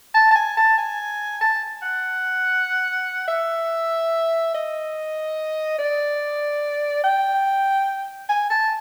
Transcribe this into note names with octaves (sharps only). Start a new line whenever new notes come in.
A5
A5
G#5
A5
G#5
A5
F#5
E5
D#5
D5
G5
G#5
A5